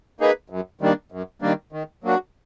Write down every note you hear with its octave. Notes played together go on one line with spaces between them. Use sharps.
A#3 D#4 G#4 B4
F#2
D#3 G3 A#3 D4
F#2
D#3 G3 A#3 D4
D#3
F#3 A#3 D4 F#4